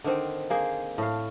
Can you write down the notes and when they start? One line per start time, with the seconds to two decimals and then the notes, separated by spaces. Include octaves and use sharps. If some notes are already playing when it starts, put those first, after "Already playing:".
0.04 D3 D#3 C4
0.50 A#3 G#4 C5
0.98 A2 F5